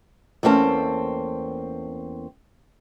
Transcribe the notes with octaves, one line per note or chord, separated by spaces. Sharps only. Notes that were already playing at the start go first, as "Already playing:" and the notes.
E2 A3 A#3 C4 C#4 A5